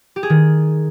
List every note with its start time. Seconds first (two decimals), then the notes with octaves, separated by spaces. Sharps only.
0.16 G4
0.23 G#4
0.30 D#3